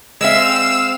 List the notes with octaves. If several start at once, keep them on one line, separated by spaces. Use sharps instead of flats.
G#3 C4 E5 F5 E6 E7